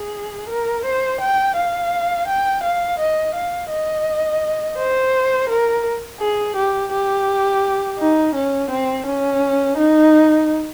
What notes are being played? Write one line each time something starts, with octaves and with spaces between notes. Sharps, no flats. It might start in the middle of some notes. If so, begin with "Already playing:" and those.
Already playing: G#4
A#4
C5
G5
F5
G5
F5
D#5
F5
D#5
C5
A#4
G#4
G4
G4
D#4
C#4
C4
C#4
D#4